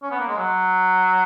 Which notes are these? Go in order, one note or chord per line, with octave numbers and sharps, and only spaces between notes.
C#4
B3
A#3
G#3
F#3